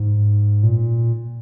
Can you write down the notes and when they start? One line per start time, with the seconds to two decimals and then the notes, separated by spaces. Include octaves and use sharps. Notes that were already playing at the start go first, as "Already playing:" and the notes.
Already playing: G#2
0.63 A#2